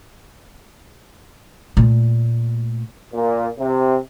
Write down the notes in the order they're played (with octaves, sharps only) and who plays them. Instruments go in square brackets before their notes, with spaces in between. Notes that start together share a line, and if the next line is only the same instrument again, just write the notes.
[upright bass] A#2 A3
[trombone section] A#2
C3